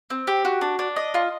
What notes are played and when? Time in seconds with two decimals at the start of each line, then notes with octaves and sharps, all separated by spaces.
0.10 C4
0.27 G4
0.45 F#4
0.61 D4
0.79 D4
0.96 D#5
1.14 F4